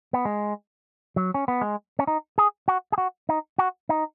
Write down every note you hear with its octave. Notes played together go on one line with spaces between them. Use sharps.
B3
G#3
F#3
C#4
B3
G#3
C#4
D#4
G#4
F#4
G#4
F#4
D#4
F#4
D#4